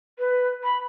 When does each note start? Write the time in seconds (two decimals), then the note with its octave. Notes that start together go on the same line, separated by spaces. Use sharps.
0.19 B4
0.64 B5